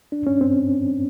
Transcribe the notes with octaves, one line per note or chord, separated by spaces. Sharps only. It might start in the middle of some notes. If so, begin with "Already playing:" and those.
D4
C#4
C4